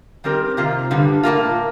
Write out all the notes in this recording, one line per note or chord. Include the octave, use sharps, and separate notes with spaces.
D#3 G3 C4 G4 A#4
C3 D#3 A#3 F4
G2 D3 G3
A2 G3 A#3 F4